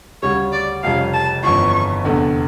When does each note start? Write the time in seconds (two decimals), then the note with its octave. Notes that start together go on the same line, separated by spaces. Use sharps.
0.23 D2 C#3 G3 C#5
0.53 D5
0.83 F1 F2 C#3 G3 F5
1.14 A5
1.43 G1 F2 C#3 E3 C#6
2.04 F1 E2 D3 A3